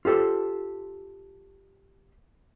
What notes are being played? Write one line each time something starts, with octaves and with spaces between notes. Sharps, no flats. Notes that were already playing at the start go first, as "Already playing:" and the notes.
F4 G4 A4 C5